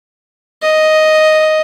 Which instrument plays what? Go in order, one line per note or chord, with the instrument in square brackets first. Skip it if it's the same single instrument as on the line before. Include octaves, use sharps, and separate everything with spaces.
[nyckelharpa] D#5